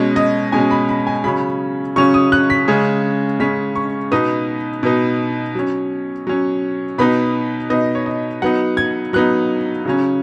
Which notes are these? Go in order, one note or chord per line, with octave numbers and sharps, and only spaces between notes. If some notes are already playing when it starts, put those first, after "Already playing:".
Already playing: B2 G#3 C#4 D#5
D#5
B2 G#3 C#4 G#5
B5
B5
G#5
C#3 F#3 C#4 B5
C#3 F#3 C#4 C#6
D#6
F#6
B6
C#3 G#3 C#4
C#3 G#3 C#4 B6
C#6
B2 B3 D#4 D#6
B2 B3 D#4
F#3 C#4
F#3 C#4
B2 B3 D#4 B5
B2 B3 D#4 D#5
C#5
D#5
F#3 B3 D#4 F#5
G#6
F#3 B3 D#4 F#6
C#3 F#3 C#4